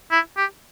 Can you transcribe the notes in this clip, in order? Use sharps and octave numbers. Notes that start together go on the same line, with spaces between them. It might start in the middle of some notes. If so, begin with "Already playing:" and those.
E4
G4